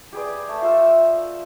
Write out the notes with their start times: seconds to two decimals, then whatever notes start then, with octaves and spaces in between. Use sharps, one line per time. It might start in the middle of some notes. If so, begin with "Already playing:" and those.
0.13 G4 G#4 B4 D5
0.49 A3
0.62 F4 A4 E5